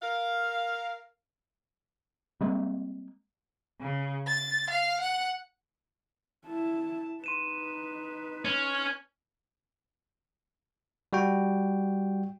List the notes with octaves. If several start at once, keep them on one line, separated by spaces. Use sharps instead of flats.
A#4 F5
G3 G#3 A#3 C4
C#3
A6
F5
F#5
E4 A5
D#4 B4 C6 D#7 E7
C#4 F6 G#6 C#7
G3 F#4 G5